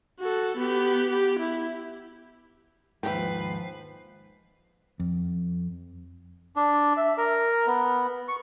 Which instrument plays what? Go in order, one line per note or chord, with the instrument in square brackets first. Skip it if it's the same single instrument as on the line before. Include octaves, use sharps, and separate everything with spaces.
[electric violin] F#4 A4
B3 G4
G4
E4
[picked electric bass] D#2 G#2 [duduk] F3 [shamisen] E4 G4 [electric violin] B4 C7
[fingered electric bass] F2
[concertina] D4
E5
A#4
B3
C#6